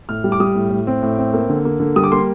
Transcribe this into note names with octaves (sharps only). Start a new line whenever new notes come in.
A2 F6
G3
D6
G3 D#6
A2
A2
C4
A2
C4
A#3
D3
A#3
D3
G3 D#6
D6
A#3 C6